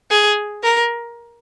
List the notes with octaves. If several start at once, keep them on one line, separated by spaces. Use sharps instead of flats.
G#4
A#4